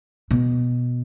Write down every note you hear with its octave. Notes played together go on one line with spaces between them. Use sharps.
B2